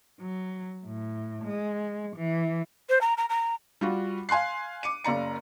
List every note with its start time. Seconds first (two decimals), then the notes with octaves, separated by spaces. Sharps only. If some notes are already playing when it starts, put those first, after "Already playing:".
0.20 F#3
0.86 A2
1.44 G#3
2.16 E3
2.89 C5
3.01 A#5
3.17 A#5
3.30 A#5
3.81 G3 F4 F#4
4.29 F5 G#5 C6 F#6 C7
4.83 D6 C#7 D#7
5.04 F#1 C#3 D5 A#5 C#7